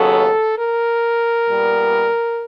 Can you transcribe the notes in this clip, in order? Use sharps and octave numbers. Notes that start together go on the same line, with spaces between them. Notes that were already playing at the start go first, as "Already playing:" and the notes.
Already playing: D#2 C#3 F#3 B3 A4
A#4
A#2 G3 B3